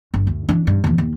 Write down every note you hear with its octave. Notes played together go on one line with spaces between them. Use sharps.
G1
D2
E3 D4
G2
D#2 E3
D#2